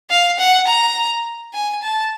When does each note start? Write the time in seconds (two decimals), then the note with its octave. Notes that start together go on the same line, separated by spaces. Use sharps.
0.10 F5
0.39 F#5
0.67 A#5
1.54 G#5
1.82 A5